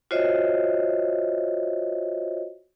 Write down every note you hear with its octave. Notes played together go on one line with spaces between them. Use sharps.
F4 F#4 C5 C#5 D#5 E5